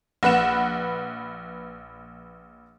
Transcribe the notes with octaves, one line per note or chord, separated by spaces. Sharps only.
A#1 B4 F#5 E7